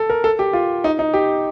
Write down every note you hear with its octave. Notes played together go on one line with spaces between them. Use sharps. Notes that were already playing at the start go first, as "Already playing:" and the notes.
Already playing: A4
A#4
A4
G4
F4
D#4
D#4
G4